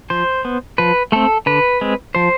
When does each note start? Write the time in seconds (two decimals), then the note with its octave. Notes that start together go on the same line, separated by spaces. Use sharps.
0.10 F3 C5
0.45 B3
0.78 F3 B4
1.12 A3 C4 A4
1.46 D3 B4
1.81 G#3 C4
2.15 F3 C5